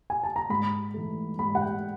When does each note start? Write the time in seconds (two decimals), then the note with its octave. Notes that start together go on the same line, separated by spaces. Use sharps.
0.10 G#5
0.23 A5
0.36 A#5
0.49 G#2 B5
0.94 E3 A3
1.39 G#2 B5
1.55 F#5
1.61 G5